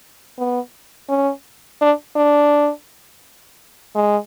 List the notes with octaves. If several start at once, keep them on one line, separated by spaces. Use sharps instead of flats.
B3
C#4
D4
D4
G#3